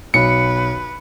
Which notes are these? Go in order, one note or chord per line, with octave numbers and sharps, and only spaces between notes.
B1 B4 C#7